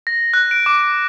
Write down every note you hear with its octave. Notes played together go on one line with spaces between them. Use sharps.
A#6
F#6
D7
D6